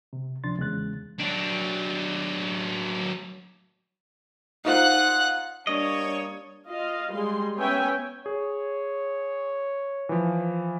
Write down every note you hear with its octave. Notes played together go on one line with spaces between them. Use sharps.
C3
C#2 C3 F3 D4 C6 A6
E2 C#3 G#3 F#6 A6
F#3 D4
D#4 F4 C5 F#5 F#6
G3 A#3 D4 C#5 D#5
F4 D#5 F5
G3 G#3 G#4 C6
B3 C#4 C#5 E5 G5 G#5
G#4 C#5
E3 F3